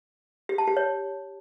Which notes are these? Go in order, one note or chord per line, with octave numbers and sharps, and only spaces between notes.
G4
A5
G4
C#5